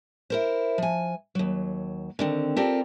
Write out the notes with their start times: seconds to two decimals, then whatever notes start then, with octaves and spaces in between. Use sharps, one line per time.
0.30 E4 A#4 C5
0.78 F3 G#5
1.35 D#2 F#3
2.19 D3 D#3 C4
2.57 C4 F4 G4 A4 A#4 D5